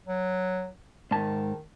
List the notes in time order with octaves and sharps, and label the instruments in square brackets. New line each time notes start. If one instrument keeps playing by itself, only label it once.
[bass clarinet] F#3
[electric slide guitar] G#2 A5 [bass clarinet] D#3